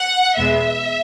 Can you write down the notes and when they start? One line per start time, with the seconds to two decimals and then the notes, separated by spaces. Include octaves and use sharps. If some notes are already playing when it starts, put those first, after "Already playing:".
Already playing: F#5
0.38 E2 B2 G#3 B3 E5